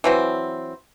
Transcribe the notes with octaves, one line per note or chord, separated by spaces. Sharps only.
E3 F#3 C4